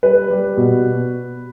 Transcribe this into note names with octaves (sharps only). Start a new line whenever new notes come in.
G3 B4
G3
B2